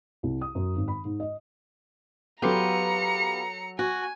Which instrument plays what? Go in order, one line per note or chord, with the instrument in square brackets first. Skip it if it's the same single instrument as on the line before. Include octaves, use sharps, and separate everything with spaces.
[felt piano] C2
D#6
F#2
G#1
B5
G#2
D#5
[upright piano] F#3 A4 [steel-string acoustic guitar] B3 F4 G4 [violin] A#5 C#7
[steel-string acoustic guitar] F#4 [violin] G#5